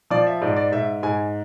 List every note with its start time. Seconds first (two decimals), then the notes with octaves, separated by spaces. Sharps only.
0.10 F3 D5
0.27 E5
0.42 G#2 D5
0.57 D5
0.72 G#2 E5
1.03 G#2 G#5